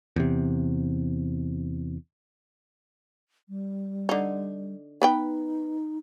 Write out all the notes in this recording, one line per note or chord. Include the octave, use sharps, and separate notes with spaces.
E2 C3
G3
D3 D#4
B3 D#4 B4 G5